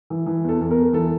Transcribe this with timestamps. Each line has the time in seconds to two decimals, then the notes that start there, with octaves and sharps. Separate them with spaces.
0.10 E3
0.26 E3
0.44 E2 A4
0.61 E2
0.71 A#4
0.78 E2
0.93 E3 A4